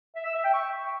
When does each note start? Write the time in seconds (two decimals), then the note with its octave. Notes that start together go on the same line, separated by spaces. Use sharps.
0.16 E5
0.25 E6
0.34 E5
0.44 G5
0.53 C#6